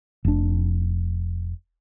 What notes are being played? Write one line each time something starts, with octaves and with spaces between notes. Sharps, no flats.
F1 D4